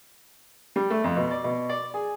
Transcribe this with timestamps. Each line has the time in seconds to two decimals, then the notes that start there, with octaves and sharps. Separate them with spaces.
0.76 G3
0.90 A3
1.04 F2
1.17 B2
1.31 D5
1.44 B2
1.69 D5
1.94 G#4